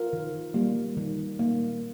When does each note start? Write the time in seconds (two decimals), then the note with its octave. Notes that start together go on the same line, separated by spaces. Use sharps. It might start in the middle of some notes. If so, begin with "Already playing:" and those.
Already playing: F4 A#4
0.13 D#3
0.54 G3 A#3
0.97 D#3
1.39 A#3